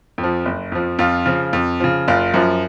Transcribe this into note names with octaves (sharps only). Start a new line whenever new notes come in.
F2
F3
F#1
F2 F3
F2 F4
C#3 F3
F2
C#3 F3
F#1 F4
F#2 F3